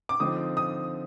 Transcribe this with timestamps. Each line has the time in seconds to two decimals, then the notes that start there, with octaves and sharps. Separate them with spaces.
0.09 D6
0.20 D3 F3 C4 D#4 D#6
0.57 D#6